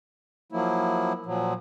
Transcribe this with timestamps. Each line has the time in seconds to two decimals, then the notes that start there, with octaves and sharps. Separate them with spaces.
0.52 F3 F#3 A#3 E4
1.26 A#2 F3 F#3